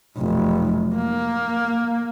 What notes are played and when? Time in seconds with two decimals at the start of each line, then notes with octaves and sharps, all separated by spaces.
0.17 F1 B1
0.95 A#3